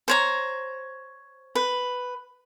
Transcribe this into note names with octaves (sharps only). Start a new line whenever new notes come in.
C5 C#5 A#5
B4